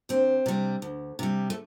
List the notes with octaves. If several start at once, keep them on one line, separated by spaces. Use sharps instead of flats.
D2 C4
C3 G3
D2
C3 G3
A3